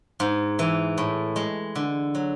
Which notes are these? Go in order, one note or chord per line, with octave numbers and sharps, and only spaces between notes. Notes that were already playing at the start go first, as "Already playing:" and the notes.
G#2
E3
A2
G#3
D3
F#3